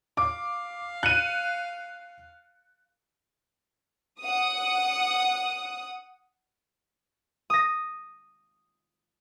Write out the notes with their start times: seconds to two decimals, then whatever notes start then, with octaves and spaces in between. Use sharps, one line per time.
0.17 F5 D6
1.03 F#6 C#7 D#7
4.21 F#5 D#6
7.50 D#6 A#6